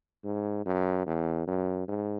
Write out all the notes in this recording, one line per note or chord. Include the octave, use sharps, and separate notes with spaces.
G#2
F#2
E2
F#2
G#2